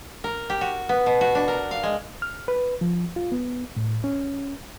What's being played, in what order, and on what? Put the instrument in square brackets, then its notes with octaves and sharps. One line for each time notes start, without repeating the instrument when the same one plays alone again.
[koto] A#4
G4
F#4
B3
B2
F#4
D4
A#4
F5
G#3
[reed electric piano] F6
B4
F3
F4
B3
A2
C#4